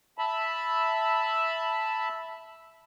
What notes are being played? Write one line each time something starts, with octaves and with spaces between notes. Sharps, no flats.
E5 A5 B5